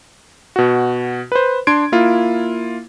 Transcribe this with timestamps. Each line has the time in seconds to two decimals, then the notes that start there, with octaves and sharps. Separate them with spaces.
0.56 B2 F#4
1.32 B4 C5
1.67 D4 C6 G#6 D7
1.92 A#3 E4 F4